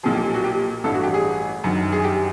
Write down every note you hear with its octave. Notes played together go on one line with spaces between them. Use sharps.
B1 A#2 F3 G#4
G4
F#4
G4
A1 G2 E3 A4
F#4
G4
G#4
G1 F#2 D#3
G#4
G4